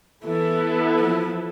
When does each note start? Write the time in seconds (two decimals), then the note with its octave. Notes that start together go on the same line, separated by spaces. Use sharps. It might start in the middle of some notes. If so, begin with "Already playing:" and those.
0.24 E3 B3 E4 A4
0.99 F3